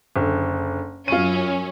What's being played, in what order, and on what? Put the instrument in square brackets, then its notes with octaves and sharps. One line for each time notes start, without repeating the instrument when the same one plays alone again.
[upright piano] F#1 D3
[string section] F#2 C#4 [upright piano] F4 D#7